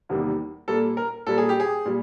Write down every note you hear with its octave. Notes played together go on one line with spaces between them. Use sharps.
E2 C3 D#3 G3 A#3
A#2 G3 A#3 A4
A#4
A#2 G3 A#3 A4
G#4
G4
G#4
A#2 G3